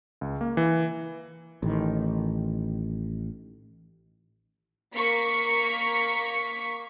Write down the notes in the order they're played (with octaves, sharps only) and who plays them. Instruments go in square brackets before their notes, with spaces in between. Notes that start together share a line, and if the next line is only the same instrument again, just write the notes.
[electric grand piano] C#2
A#3
E3
[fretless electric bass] A1 D#3
[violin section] A#3 C#6 B6